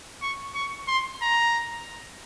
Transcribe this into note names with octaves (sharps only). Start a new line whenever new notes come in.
C#6
C#6
C6
A#5